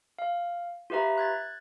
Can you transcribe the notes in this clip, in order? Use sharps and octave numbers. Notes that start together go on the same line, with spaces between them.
F5
F4 G4 B4 E5 A#5
F#6 G#6 A6